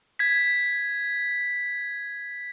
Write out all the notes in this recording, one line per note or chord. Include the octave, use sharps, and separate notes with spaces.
G#6 B6